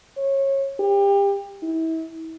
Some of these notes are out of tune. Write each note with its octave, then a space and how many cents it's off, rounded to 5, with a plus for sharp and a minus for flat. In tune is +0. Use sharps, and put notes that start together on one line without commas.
C#5 -25
G4 +30
E4 -35